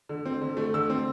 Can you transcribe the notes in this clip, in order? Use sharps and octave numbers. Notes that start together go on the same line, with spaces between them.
D3
C4
D3
A3
D3 E6
C4